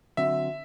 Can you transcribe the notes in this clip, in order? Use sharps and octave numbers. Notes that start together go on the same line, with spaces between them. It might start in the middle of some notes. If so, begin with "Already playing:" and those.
D3 F#3 C4 F#4 E5